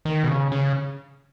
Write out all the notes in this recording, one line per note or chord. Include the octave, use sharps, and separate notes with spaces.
D#3
B2
C#3
C#3